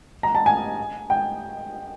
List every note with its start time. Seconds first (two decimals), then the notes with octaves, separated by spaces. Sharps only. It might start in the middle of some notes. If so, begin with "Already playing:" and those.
0.23 A#5
0.35 A5
0.46 G#5
1.10 G5